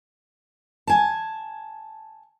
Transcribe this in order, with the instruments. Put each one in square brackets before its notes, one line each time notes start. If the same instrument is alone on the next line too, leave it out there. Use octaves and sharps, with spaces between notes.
[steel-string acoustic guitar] G#5 A5